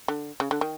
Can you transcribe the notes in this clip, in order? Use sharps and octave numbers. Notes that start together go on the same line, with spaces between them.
D3
C#3
D3
D#3